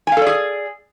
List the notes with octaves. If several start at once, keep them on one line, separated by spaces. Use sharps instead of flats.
G#4 A4 D5 F5 G#5